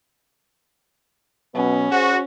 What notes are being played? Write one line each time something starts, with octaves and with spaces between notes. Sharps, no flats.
B2 F#3 B3 C#4
F#4 G#4 C5